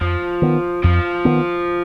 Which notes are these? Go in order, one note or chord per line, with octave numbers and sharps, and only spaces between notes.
F2 F3
D#3 B3
F2 F3
D#3 B3